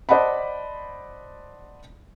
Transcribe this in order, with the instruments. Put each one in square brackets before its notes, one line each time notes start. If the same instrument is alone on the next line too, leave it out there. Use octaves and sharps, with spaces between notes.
[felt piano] C5 D5 D#5 F#5 A5 B5